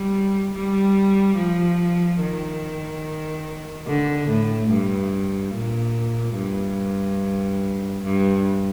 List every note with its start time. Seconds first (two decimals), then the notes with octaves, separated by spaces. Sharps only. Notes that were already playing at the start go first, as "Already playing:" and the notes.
Already playing: G3
0.54 G3
1.37 F3
2.21 D#3
3.87 D3
4.29 A2
4.70 G2
5.54 A#2
6.36 G2
8.04 G2